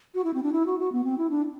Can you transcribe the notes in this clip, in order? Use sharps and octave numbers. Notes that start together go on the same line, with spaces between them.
F#4
E4
C4
D4
E4
F#4
F#4
B3
C4
E4
D4